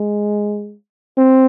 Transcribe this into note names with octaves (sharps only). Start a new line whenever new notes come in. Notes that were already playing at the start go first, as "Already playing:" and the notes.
Already playing: G#3
C4